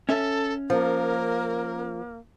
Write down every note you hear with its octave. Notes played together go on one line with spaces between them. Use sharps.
C#4 A4 E5
F3 A#3 A#4